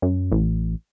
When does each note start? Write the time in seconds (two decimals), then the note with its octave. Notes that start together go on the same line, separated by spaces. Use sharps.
0.02 F#2
0.32 A1